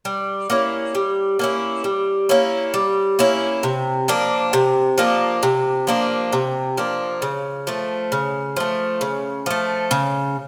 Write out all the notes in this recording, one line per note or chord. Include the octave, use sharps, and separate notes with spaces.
G3
A#3 C#4 E4
G3
A#3 C#4 E4
G3
A#3 C#4 E4
G3
A#3 C#4 E4
C3
F3 A#3 D4
C3
F3 A#3 D4
C3
F3 A#3 D4
C3
F3 A#3 D4
C#3
F3 A3
C#3
F3 A3
C#3
F3 A3
C#3